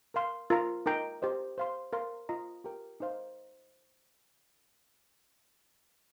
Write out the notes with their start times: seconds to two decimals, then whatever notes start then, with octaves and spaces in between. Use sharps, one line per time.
0.14 A#4 F5 C6
0.50 F4 A#4 F5 A#5
0.86 D#4 A#4 G5 A#5
1.22 G4 C5 D#5
1.58 C5 F5 C6
1.93 A#4 F5 C6
2.29 F4 D#5 A#5
2.64 G4 A#4 G5
3.00 D#4 C5 F5